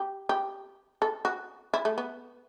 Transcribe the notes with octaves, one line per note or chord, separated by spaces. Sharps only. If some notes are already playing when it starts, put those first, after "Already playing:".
Already playing: G4
G4
A4
F#4
E4
A3
B3